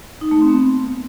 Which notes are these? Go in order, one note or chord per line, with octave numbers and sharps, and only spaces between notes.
D#4
A3
C4
B3